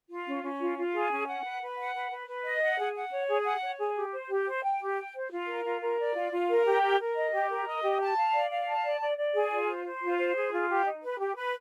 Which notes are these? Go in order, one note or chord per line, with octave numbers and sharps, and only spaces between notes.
F4
C#4
C#4
F4
F4
G#4
C#4
F#5
B4
B4
F#5
B4
B4
B4
D#5
F#5
G#4
F#5
C#5
G#4
F#5
C#5
G#4
G4
C5
G4
C5
G5
G4
G5
C5
F4
A#4
F4
A#4
D5
F4
F4
A#4
G4
A#4
A#4
D#5
G4
A#4
D#5
G4
A5
F5
D5
F5
A5
D5
D5
D5
G#4
F4
C5
C5
F4
C5
G#4
F4
G4
D#4
B4
G4
B4